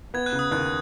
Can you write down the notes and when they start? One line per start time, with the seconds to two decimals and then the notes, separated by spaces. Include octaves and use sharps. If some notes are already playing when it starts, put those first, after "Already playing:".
0.14 B3 G#6
0.26 F#6
0.32 C#3
0.39 D#6
0.51 D#2 F#6